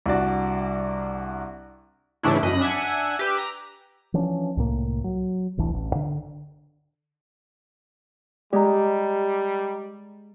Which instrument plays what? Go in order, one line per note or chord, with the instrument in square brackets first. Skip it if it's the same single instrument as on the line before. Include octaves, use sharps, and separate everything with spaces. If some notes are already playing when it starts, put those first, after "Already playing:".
[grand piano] C2 D4 F#4 D5
[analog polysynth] G#2 C#3 E3 A3 D4 E4
F#2 D#5 B5 D#6 F#6
D4 E5 F#5 G#5
G4 B4 E6
A#5
[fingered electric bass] E3 F3 C#4 D4
C2 A2 A#3
F#3
D1 A1 E3 D4
A1
D3
[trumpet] G3 [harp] G#3 [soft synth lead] G4 [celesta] D5 D#5 A#5